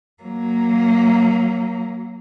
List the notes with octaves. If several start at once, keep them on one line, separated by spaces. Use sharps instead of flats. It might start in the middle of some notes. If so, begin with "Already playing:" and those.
F#3 A#3